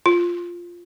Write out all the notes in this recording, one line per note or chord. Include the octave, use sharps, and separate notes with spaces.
F4